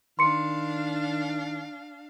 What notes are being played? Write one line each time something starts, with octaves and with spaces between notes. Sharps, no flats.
D#3 D4 F5 C6 C#7